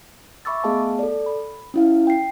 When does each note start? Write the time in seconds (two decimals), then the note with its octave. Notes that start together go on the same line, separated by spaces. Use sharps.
0.45 E5 B5 C#6 D6 E6 A6
0.64 A3 B3 G#4 D#5 F5 A5
0.99 A4 D5
1.26 B5
1.74 C#4 E4 F5
2.07 G5 C7